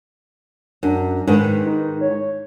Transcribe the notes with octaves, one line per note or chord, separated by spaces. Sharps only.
F#2 D4
G#2 D#3 B4
D#4
C#5